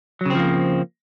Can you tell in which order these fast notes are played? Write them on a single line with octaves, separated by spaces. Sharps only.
F#3 C#3 C4 F3 A#3